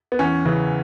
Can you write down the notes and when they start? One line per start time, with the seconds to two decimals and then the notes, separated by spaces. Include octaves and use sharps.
0.12 B3
0.19 E2 C#4
0.45 C#3 E3